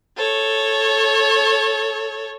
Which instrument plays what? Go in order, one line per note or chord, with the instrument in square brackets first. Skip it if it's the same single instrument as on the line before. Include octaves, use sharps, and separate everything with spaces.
[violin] A4 C#5